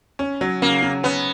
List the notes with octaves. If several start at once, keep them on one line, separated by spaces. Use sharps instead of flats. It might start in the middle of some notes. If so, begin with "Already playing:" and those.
C#4
F#3
C#3 A#3
C#3
B3 C#4